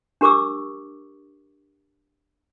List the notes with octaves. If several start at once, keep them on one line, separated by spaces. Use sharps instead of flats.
D4 G4 A#4 C#6 D6 E6